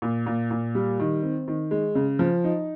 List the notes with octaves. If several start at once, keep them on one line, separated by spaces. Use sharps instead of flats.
A#2
A#2
A#2
G3
D#3
C4
D#3
G#3
C#3
F3
D#4